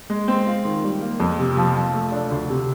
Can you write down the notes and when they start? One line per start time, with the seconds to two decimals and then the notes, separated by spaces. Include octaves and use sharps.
0.10 G#3
0.28 C4
0.46 F4
0.65 D#3
0.84 G3
1.01 A#3
1.20 F2
1.39 C3
1.57 F3
1.76 F3
1.93 A3
2.12 D4
2.31 D2
2.49 C3